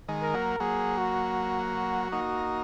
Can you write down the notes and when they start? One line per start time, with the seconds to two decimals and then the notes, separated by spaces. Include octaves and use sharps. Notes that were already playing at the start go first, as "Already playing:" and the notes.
0.08 D#3 G#3
0.22 A#4
0.34 F#3 A#3
0.60 F#3 A#3 G#4
0.98 F#4
2.12 A#3 D#4